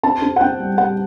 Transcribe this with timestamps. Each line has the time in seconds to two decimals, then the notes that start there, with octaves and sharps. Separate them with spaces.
0.03 C4 A5
0.22 C4
0.36 F#5
0.41 C4 G5
0.60 G3
0.78 G3 F#5